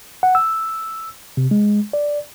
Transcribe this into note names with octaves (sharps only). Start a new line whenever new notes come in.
F#5
E6
C3
G#3
D5